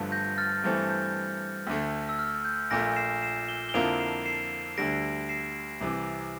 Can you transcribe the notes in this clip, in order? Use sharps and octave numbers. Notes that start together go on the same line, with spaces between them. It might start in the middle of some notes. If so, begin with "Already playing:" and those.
Already playing: G1 G2 D3 F3 A3
G6 A#6
F6 A6
G2 E3 A3 C4
G6
D2 D3 A3
E6
F6
G6
A#1 A#2 A3 A#6 D7
C7 E7
C7 E7
E7 G7
G7
F2 D3 F3 A#3 E4 D7 F7
C7 E7
C7 E7
D2 D3 G3 A#6 D7
C7 E7
C2 C3 E3